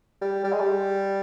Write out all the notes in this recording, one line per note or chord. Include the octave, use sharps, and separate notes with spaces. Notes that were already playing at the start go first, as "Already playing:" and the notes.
G3
G3
G#3
G3